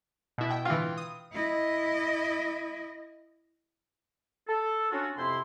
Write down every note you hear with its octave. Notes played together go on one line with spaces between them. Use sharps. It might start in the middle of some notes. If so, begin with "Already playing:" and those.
B2 E4
G5
E3 F4
D#6
E4 D#5
A4
C#4 D4 F4 F#4
F2 C3 E4 C6